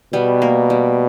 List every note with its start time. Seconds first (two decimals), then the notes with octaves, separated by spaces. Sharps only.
0.13 B2 G3 B3
0.42 A#3
0.70 G3